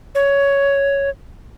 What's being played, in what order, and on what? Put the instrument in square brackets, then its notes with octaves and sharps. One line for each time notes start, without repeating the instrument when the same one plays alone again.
[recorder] C#5